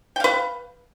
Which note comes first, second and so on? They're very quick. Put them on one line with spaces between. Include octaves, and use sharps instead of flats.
G5 F5 B4